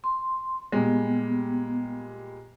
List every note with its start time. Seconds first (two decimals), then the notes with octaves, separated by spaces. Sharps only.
0.04 C6
0.72 A#2 G3 G#3 B3